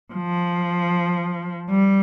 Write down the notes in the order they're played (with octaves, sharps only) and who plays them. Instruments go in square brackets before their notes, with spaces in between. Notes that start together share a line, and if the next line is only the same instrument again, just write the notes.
[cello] F3
G3